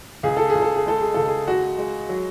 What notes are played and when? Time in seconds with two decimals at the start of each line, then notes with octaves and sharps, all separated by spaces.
0.23 C#2 G#4
0.37 A4
0.50 G#4
0.55 C#2
0.62 A4
0.76 G#4
0.86 G#3 A4
1.01 G#4
1.14 C#2 A4
1.28 G#4
1.48 G#3 F#4
1.78 G#3
2.09 F#3